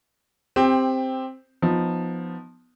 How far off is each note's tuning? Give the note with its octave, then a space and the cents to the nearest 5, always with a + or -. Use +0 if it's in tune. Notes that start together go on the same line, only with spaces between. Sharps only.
C4 +0 G4 +20
F3 +10 B3 +5 D#4 +0